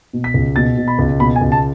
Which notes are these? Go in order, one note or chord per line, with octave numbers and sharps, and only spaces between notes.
B2
B6
C#2
B2 A6
B2
B5
C#2
B2 B5
G#5
C#2
A5